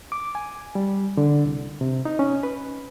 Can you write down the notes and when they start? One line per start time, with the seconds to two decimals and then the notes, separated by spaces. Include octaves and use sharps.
0.12 D6
0.35 G#5
0.75 G3
1.17 D3
1.45 C2
1.81 C3
2.05 D#4
2.19 C#4
2.43 B4